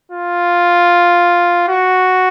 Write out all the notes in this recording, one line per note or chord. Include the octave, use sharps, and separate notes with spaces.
F4
F#4